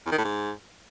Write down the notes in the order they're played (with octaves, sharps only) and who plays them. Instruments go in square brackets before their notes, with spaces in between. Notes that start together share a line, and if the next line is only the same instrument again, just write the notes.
[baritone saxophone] E2
D#3
A2
G#2